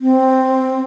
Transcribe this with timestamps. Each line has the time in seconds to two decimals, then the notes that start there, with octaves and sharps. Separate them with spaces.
0.01 C4